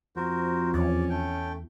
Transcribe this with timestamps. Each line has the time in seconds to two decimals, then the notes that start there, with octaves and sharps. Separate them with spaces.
0.16 F2 F#4 A#4 C5
0.74 E2 C#4 D5
1.10 A3 G5